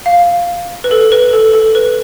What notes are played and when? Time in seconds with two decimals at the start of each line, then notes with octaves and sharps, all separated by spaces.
0.06 F5
0.84 B4
0.91 A4
1.12 B4
1.33 A4
1.54 A4
1.75 B4